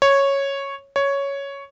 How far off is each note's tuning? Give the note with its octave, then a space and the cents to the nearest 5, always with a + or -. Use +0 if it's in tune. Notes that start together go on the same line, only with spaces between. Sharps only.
C#5 -5
C#5 +5